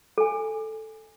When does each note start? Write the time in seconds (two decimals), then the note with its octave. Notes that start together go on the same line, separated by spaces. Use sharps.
0.18 A4 G#5